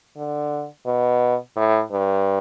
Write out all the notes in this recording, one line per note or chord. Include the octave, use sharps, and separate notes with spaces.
D3
B2
A2
G2